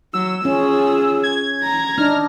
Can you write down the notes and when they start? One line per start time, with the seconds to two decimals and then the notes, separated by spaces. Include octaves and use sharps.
0.14 F#3 E6
0.45 C#4 F4 G#4
1.23 G#6
1.64 A#5
1.98 D4 D#4 F6